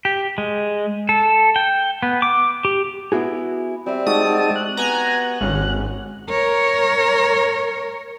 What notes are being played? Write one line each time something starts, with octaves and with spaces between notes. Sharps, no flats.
G4
G#3
A4
G5
B3
D6
G4
B3 E4 F#4 G#4
G3 C4 E5
G#3 D#4 F#4 G4 F#5 A5 D#6
F#6
B3 G#5 A#5
G#1 C#4
A#4 C#5